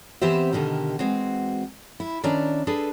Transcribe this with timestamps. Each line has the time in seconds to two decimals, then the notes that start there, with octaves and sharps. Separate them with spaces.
0.22 E3 B3 C4 G4 C5 E5
0.53 B2 D3 D#3 G4 A#4
0.99 E3 G#3 C4 F#4
2.00 E4
2.24 D#3 C#4 D4 E4 D5 A#5
2.67 D4 G#4 A4 B4